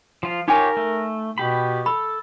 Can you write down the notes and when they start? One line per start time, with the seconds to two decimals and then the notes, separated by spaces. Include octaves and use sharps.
0.23 F3 F4
0.48 D#4 F4 G4 A#4 C#5 G#5
0.77 A3
1.38 B2 G4 B5
1.86 A4 B5